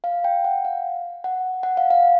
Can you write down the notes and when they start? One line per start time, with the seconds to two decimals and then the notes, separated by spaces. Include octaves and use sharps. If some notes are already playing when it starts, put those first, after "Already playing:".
0.04 F5
0.24 G5
0.44 F#5
0.65 F5
1.24 F#5
1.63 F#5
1.77 F5
1.90 F5